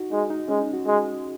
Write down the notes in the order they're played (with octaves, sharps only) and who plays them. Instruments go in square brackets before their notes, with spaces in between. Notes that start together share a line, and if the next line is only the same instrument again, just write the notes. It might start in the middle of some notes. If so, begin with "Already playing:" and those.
Already playing: [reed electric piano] D#4 F#4
[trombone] G#3 [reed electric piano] D#4
[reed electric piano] D#4
[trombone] G#3 [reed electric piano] C#4
[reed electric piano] D#4
F#4
[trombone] G#3